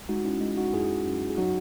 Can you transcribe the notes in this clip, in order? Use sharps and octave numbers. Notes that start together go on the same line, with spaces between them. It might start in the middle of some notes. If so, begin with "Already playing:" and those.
Already playing: C2
G#3 D#4 F#4
C#4 E4
G#3
D#4 F#4
F#2 E4 G#4
F#2
G#4
F#3 D#4 F#4